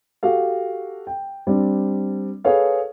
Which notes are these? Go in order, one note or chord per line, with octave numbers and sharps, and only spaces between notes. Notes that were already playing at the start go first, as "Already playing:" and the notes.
F#4 G4 A4 F5
G5
G3 C4 D4
G#4 A4 B4 C#5 F5